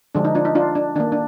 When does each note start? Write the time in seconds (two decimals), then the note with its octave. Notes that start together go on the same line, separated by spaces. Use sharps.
0.15 D3 F3 G#3 D4
0.25 D#4
0.35 D4 F4
0.45 D#4
0.55 D4 F4
0.75 D4
0.95 D#3 A#3 D4
1.12 D4